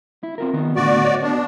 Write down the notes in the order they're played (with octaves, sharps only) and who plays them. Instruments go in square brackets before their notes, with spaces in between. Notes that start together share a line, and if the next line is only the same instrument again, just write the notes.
[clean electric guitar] E4
C4 F4 A#4
D#3 B3
[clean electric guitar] A2 D3 B3 [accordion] F#4 D5
[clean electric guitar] C#5 D#5
[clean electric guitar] B3 [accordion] D4